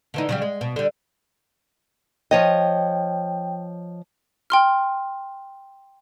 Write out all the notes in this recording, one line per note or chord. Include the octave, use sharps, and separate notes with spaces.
D3 E3 D#4
C#3 F#3 G3
G#3
B2
D3 G3
F3 C#5 D#5 G5
G5 C6 F6